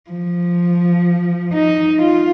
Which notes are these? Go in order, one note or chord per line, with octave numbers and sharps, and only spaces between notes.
F3
D#4
F4